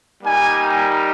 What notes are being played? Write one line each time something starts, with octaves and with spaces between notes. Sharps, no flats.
G3 A#3 D#4 G4 G#5
A#5